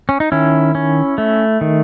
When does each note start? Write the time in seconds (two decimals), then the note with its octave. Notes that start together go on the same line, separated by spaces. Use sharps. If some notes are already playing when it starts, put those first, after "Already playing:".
0.09 C#4
0.20 D#4
0.32 D#3 C#4 E4
0.75 C#4
1.18 A3
1.61 D#3